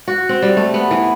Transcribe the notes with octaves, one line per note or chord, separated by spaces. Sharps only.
F#4
C4
G3
A3
B3
E3